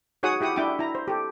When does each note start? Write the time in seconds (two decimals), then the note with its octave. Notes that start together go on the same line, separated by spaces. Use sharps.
0.23 D#4 F#4 G#4 C#5 F#5 D#6
0.41 E4 G4 F#5 D#6
0.56 D4 E4 G5 D6
0.79 E4 A#5
0.95 C5
1.08 G4 A4